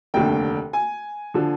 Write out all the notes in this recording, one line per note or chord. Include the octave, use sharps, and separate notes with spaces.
F1 D#2 D3 G5
G#5
D3 F3